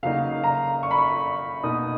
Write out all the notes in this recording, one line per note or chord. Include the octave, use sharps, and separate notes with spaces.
C#3 F#3 A#3 D#4 F5
A#5
C#6
B5
C#6
B2 A#3 D#4 D#6